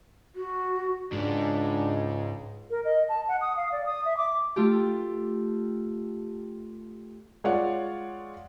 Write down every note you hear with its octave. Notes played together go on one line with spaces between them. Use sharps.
F#4
C#2 G#2 G#3 D4
A#4
D#5
A5
F#5
D#6
F5
D5
D#6
E5
D6
A3 F4 G4
G#3 F4 C#5 D5 F#5